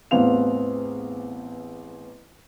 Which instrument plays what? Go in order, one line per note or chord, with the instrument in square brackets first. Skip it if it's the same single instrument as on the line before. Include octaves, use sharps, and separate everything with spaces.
[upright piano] A1 E2 B3 C4 F5 F7